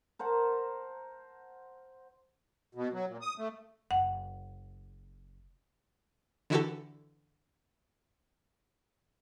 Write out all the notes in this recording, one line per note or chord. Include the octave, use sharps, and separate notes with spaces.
A#4 C5 F#5 A5
B2
F#3
A#2
D#6
A3
F#1 F#5
D3 E3 E4 F#4 G4 A4